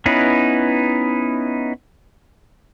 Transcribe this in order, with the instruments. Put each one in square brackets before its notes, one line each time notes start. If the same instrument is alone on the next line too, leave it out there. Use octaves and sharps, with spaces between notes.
[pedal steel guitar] B3 C#4 D#4 E4 B4